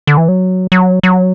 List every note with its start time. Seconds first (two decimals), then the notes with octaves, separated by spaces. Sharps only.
0.07 D3
0.17 E3
0.28 F#3
0.72 F#3
1.03 F#3